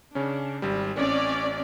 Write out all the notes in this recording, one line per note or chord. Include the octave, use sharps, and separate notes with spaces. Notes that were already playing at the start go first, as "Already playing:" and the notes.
C#3 C#4 D4
G#1 G3
A1 C4 C#4 D5